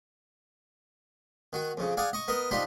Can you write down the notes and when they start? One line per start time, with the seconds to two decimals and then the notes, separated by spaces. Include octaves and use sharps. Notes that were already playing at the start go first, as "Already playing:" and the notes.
1.53 D#3 F#4
1.77 F2 C#3
1.97 G#4 D5 F5 F#5
2.13 D#5 C#6
2.28 B3 A#4 D#5
2.51 F3 D4 D#4 G4 B5 C6